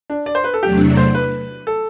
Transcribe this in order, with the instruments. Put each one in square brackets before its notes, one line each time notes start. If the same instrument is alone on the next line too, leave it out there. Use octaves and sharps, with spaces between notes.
[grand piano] D4
D5
C5
B4
A4
[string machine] E2 C3 F#3 A3 D4 [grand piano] G4
[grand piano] C5
B4
A4